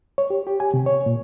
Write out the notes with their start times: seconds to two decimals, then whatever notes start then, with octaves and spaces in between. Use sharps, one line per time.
0.18 C#5
0.30 G4
0.47 G4
0.60 G#5
0.74 C3
0.86 C#5
1.06 A#2